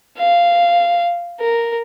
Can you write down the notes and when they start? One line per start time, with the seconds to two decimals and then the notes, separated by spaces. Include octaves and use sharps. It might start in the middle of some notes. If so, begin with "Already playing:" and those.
0.18 F5
1.40 A#4